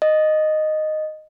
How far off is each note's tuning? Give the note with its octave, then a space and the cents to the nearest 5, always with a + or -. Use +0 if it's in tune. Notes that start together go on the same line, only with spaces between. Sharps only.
D#5 -5